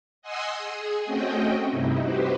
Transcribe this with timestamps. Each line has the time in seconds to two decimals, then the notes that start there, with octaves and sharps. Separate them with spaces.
0.22 D#5 F#5 G#5 C6 D#6 E6
0.58 G#4
1.05 A3 C4 C#4 F#4 D#5 G5
1.70 G2 C3 D#4 E4
2.00 F#4 G4 B4 C5